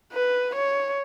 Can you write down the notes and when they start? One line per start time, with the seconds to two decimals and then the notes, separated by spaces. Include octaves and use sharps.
0.13 B4
0.55 C#5